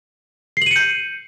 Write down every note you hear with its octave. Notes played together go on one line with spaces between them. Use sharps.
G6 C7 C#7 D#7 F#7